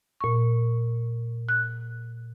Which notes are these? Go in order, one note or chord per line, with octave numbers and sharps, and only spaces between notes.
A#2 C#6
F#6